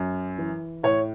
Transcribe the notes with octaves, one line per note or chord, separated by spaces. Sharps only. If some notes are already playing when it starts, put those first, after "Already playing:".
Already playing: F#2
E3
A2 C#5